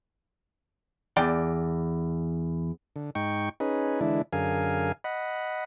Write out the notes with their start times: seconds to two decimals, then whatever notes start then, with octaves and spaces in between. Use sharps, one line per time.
1.17 E2 D5 G5
2.96 D3
3.15 G#2 D#4 G5 C#6
3.60 C#4 D#4 G#4 B4
4.01 D3 E3 G#3 D4 E4
4.33 F#2 D3 G#4 A#4 F5 G#5
5.04 D#5 F#5 B5